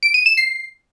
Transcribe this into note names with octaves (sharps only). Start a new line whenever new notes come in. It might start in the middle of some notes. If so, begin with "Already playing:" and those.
D7
D#7
E7
C7